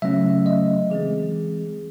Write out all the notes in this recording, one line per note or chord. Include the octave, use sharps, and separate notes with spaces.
C#3 F#3 A3 C#4 E5
D#5
E3 G#3 C4 G#4